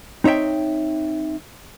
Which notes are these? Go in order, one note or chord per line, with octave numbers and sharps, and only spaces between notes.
C4 D#4 C#5 E5 G5